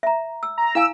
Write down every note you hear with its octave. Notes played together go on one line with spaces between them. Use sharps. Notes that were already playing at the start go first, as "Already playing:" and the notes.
E5 A#5
E6
A#5
E4 F5 G#5 E6